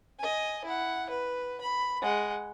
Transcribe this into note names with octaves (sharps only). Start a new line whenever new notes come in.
D#5 G#5
E4 F#5
B4
B5
G#3 F#5